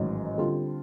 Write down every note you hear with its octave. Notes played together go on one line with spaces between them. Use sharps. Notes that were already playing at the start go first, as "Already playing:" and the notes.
Already playing: A1 G#2 D#3 F#3
D3 G3 C4 F4